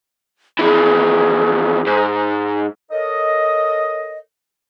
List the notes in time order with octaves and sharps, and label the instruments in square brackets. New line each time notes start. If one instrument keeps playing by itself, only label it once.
[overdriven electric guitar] F2 E3 [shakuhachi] G#4
[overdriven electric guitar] G#2
[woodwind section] A4 A#4 C#5 D#5